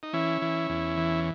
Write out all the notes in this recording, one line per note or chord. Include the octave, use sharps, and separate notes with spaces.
D#4
E3 C#4 E4
E3
E2
E3